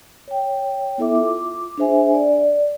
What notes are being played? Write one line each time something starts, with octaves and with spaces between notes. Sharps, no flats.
C#5 G5
B3 E4 A4 E5 D6
F4 D6
D4 G#4 C5 E5 G#5
D5